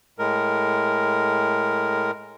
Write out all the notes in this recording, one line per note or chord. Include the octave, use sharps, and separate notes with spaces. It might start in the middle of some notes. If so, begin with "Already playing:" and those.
A2 G#3 A#4